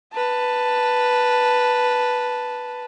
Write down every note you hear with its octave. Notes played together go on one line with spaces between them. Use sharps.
B4 A5